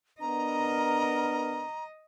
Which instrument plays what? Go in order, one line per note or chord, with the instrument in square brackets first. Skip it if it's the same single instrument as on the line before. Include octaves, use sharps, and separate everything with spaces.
[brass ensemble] B3 D4 A#4 [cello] D#5 [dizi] A#5